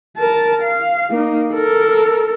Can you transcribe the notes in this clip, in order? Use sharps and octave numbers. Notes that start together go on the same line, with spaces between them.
A#4 A5
F5
A#3 D#4
A4 A#4